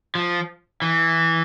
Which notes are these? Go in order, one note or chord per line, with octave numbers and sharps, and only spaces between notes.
F3
E3